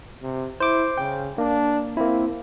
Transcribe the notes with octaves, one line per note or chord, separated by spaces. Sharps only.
C3
E4 C5 D6
C#3 G5
A#3 D4
A#3 C4 E4